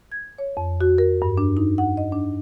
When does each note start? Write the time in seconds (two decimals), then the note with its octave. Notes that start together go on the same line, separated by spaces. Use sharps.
0.12 G#6
0.38 C#5
0.57 F2
0.81 F#4
0.98 A#4
1.22 G2
1.38 D4
1.57 D#4
1.78 F#5
1.97 D#5
2.12 D4